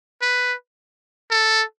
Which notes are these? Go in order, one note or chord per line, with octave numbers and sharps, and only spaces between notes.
B4
A4